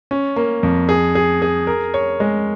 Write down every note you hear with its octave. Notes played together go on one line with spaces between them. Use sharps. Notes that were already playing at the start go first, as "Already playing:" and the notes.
C#4
A#3
F2
G#4
G#4
G#4
A#4
C#5
G#3